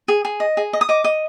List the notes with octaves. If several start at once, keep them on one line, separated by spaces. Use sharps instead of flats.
G#4
G#4
D#5
G#4
D#5
D#6
D#5 D6
D#5